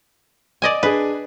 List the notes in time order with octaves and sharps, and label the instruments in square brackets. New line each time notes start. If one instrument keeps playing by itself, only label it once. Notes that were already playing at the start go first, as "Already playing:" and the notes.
[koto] D5 D#5 G#5
[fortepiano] D4 G#4 [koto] B4